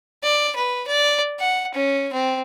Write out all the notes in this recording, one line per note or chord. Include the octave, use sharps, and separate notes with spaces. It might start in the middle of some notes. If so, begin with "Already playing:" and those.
D5
B4
D5
F#5
C#4
C4